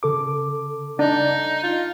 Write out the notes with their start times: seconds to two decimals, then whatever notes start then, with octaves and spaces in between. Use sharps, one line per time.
0.03 C#3 A4 D6
0.99 D4 D#4
1.63 F4